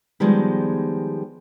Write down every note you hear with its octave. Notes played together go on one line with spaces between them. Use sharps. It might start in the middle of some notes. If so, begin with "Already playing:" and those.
D#3 F3 G3 G#3 B3